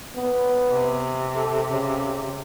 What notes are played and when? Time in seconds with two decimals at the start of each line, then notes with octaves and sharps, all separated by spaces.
0.16 B3
0.70 C3
1.36 A4
1.70 C#3